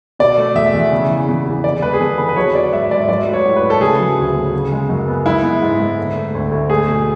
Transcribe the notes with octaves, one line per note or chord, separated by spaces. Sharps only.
B2 D5
A3
E2 E5
E2
C#3
E3
E2
E2
D3 D5
G#3 B4
G#4
E2 A4
B3 B4
B4
F#3 C#5
B3 D5
G#2 E5
G#2 D5
F#3 D5
A3 B4
C#5
A2
B4
A2
A4
C#3 G#4
F#3
D2
B3
C#3
G#3
F#2
B3
G#3 E4
B3
G#2
G#2
D3
A3
D2
D2
A3 G#4
B2